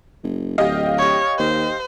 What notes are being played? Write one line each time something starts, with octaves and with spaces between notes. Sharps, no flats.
F#1
D1 G4 D#5 F5
C#5
D#2 C5